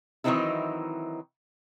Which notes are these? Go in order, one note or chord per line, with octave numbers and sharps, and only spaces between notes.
D#3 E3 F#3 C4 D#4 E4